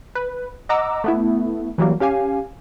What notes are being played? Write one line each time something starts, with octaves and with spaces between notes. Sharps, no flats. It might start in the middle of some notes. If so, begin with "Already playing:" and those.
B4
D#5 F#5 A#5 D6 E6
A3 B3 E4
E3 F#3 G3 A#3
C#4 G4 F5 G#5